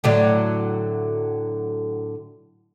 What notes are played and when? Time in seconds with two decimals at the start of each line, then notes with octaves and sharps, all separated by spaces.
0.04 A2 D3 F#3